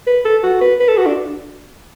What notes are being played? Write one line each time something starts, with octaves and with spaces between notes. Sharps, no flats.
B4
A4
F#4
B4
B4
A4
F#4
D4